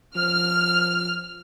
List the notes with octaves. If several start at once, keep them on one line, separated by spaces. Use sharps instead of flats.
F3 F6